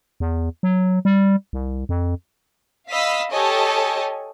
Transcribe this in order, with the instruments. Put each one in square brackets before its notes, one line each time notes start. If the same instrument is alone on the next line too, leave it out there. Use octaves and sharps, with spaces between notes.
[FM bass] E2
F#3
G3
C2
F2
[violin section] D#5 F5 B5 E6 B6
G4 A4 C#5 D#5 G#5